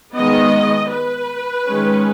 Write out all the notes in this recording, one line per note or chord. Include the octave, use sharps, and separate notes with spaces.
D#3 G#3 B3 D#5
B4
D#3 G#3 C#4